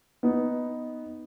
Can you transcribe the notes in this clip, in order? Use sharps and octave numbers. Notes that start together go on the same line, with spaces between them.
B3 D#4